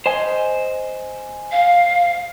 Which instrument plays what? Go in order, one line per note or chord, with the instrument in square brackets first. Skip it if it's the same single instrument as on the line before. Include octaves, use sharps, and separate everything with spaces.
[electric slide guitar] C5 D#5 G#5
[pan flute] F5